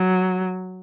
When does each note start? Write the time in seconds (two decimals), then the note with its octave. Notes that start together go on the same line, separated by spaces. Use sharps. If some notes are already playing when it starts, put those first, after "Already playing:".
Already playing: F#3